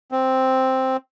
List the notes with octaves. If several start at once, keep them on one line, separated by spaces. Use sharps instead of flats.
C4